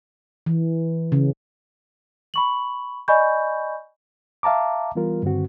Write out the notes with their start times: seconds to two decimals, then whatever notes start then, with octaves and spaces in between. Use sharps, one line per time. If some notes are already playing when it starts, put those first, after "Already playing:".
0.46 E3
1.12 C#3
2.34 B5 C#6 F#7
3.08 D5 D#5 G#5 B5 C#6 G6
4.43 E5 F5 A5 A#5 D6
4.95 E3 G3 B3 F4 A#4
5.23 G2 D3 D#3 C4 F#4